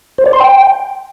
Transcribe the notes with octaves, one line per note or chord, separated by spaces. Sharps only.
C5
D5
C6
G5